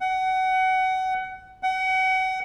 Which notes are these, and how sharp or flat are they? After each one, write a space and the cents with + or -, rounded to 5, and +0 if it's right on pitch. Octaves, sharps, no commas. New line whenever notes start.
F#5 +25
F#5 +30